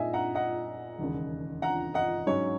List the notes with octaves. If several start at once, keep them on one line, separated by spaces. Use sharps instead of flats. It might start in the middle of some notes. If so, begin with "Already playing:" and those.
Already playing: A#2 G#3 D#4 D#5 E5 G#5
F#5 A#5
D#5 F#5
E1 D#2 C#3
F#5 A#5
D#5 F#5
G#2 F#3 C#4 C#5